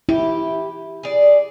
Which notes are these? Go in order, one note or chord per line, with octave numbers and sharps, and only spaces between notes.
E4 G4
G#4 D5